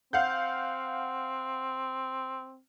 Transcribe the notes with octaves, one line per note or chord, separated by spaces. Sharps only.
C4 F5 F#5 G6